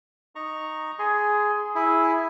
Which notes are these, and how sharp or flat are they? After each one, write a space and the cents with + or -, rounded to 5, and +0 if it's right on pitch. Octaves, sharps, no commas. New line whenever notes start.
D#4 -5 A#5 +0 C#6 +0
G#4 +10 C6 -20
E4 +0 G#4 +0